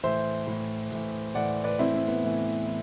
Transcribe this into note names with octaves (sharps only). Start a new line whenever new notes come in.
A2 E3 C5 E5
A2 E3
A2 E3
A2 E3 D5 F#5
B4 D5
A2 E3 C4 E4
C4
B3
A2 E3
E3